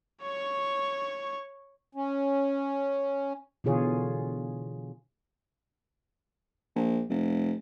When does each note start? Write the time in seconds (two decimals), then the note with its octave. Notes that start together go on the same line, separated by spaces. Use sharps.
0.23 C#5 C#6
1.95 C#4
3.64 B2 D3 E3 F4 G#4 C#5
6.76 A#1
7.10 F1